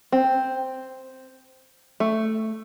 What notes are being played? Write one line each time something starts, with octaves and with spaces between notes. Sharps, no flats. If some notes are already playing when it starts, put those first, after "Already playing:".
C4
A3